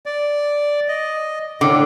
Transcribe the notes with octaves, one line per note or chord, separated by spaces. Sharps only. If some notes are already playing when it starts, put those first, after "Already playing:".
D5
D#5
A2 D3 D#3